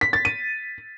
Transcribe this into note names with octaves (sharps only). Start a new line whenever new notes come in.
B6
A6
D#7